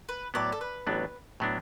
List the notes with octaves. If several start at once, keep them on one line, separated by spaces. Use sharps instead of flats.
B4
A2 F#3 B3 D5
A4
B4
A1 A2 F#3 B3 D4
A2 F#3 B3 D4